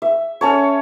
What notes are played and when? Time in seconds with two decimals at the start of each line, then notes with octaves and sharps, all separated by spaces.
0.02 E5
0.41 C#4 A4 C#5